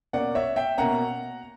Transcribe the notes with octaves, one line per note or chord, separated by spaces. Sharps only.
B2 A#3 C#4 D5 F#5
C#5 E5
E5 G5
B2 A#3 C#4 F#5 A#5